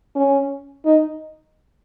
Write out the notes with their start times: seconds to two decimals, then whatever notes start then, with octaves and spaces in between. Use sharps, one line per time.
0.15 C#4
0.85 D#4